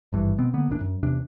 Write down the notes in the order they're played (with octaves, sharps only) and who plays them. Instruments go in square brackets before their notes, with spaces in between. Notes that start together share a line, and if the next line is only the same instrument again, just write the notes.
[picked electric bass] G#1 G2 E3
B2 B3 C4
D3 A#3 B3
A#1 E2 A#2 D4
F#2
E2 C3 D4